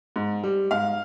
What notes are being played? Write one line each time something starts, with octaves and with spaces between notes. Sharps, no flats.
G#2
G3
G#2 F5